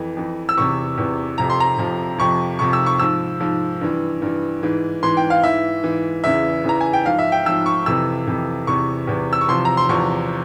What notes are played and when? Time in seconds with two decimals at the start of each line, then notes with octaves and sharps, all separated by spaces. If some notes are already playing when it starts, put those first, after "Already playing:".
Already playing: F2 E3
0.17 F2 E3
0.49 E6
0.57 E2 C3 E3 C#6
0.98 E2 C3 E3
1.38 F2 C3 F3 A#5
1.50 C6
1.60 A#5
1.78 F2 C3 F3
2.18 F2 C3 F3 C#6
2.59 F2 C3 F3 C#6
2.73 E6
2.86 C#6
2.99 G#2 F3 E6
3.40 G#2 F3
3.81 G2 E3
4.22 G2 E3
4.63 G#2 E3
5.03 G#2 E3 C6
5.17 G5
5.30 F5
5.42 G#2 E3 E5
5.84 G#2 E3
6.24 E2 C#3 E3 E5
6.64 E2 C#3 E3 A#5
6.81 G#5
6.93 G5
7.05 G#2 F3 F5
7.19 E5
7.32 G5
7.46 G#2 F3 E6
7.66 C#6
7.86 F2 C3 E3 E6
8.27 F2 C3 E3
8.67 E2 C3 E3 C#6
9.07 E2 C3 E3
9.33 E6
9.41 C#6
9.48 E2 C3 F3 C6
9.65 A#5
9.77 C6
9.89 E2 C3 F3 C#6